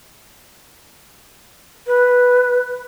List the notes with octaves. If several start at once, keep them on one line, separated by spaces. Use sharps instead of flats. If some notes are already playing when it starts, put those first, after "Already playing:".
B4